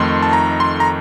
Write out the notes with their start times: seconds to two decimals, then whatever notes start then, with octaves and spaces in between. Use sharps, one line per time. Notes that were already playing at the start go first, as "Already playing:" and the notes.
Already playing: F2 D#3 A3 C6
0.22 A5
0.33 A#5
0.60 C6
0.80 A#5